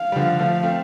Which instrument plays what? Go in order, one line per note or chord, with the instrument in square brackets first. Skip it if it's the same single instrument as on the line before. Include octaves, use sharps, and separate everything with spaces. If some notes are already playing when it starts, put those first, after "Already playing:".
Already playing: [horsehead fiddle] F5
[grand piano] G3
D3 F3
F3 A3
A3 C4